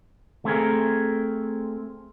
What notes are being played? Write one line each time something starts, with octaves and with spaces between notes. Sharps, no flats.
A3 C4 G#4 A#4